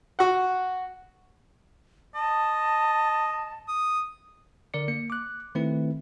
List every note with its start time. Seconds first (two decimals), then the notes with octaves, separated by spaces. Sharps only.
0.19 F#4 F#5
2.15 D#5 A5
3.68 D#6
4.74 D3 A#4 D5 C#7
4.88 A#3 C#7
5.10 D6 F#6
5.55 D#3 A3 C4 E4 B4